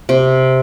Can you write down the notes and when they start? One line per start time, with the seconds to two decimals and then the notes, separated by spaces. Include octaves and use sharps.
0.09 C3